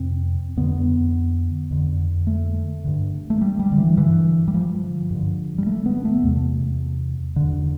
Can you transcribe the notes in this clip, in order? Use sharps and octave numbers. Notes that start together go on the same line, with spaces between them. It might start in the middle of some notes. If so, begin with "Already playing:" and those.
Already playing: F2 C3 C4
F2 D3 B3
F2 D3
A3
G2 D3
A3
G3
G3
D3
E3
G2 D3 E3
G3
F3
G2 D3
G3
A3
B3
A3
E2 C3
E2 D3